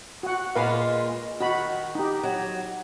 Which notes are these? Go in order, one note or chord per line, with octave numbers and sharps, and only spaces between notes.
F#4 F#5
A#2 G#3 F4 A#4 B4 F5
D#3 F#4 B5
D#4 G4
F#3